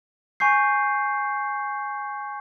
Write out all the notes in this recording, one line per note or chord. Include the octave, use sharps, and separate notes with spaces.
G#5 C#6 G6 C7